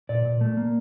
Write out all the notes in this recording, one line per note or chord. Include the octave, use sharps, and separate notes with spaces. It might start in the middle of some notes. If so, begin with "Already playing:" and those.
A#2 D5
A#2
A3
A#3